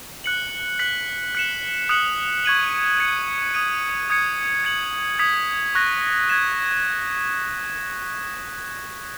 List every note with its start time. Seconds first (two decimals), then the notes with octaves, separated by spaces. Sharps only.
0.24 F#6 C#7 F#7
0.79 F#6 B6 F#7
1.35 F#6 C#7 E7
1.89 D#6 F#6 C#7 F#7
2.45 C#6 G#6 D#7 F#7
3.00 G#6 C#7 F#7
3.54 D#6 G#6 D#7
4.10 D#6 G#6 C#7
4.65 G#6 C#7 F#7
5.19 D#6 G#6 B6
5.75 C#6 F#6 A#6
6.29 G#6 B6 E7